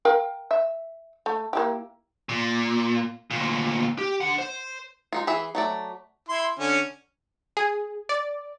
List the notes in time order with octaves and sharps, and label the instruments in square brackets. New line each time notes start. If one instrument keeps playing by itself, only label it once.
[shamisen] A#4 F5 G5
E5
A3
A#3 E4 G4
[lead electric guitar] A#2
D2 A#2
G4
D3 F#5
C5
[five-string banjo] G#3 D#4 F4
E3 G#4 E5
F#3 A3 D5
[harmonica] E4 C6
D3 C#4
[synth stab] G#4
D5